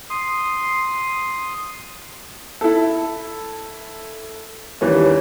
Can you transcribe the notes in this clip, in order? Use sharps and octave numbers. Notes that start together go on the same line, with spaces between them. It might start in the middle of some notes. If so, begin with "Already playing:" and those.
C6 D#6
E4 A4
D#2 E3 G3 C#4